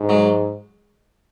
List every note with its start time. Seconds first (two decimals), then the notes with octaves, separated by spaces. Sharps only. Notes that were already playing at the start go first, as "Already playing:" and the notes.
Already playing: G#2
0.09 F#3 G#3